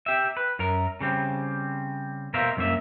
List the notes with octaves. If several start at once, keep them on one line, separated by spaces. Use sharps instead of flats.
G4 E5
B4
F#2 A#4
C#3 G3 C4
B2 A#4 C5 E5 F5
C2 F#2 A#3 E5